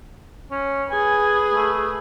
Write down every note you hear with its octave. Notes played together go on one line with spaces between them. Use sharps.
C#4
G#4 B4 G#5
A3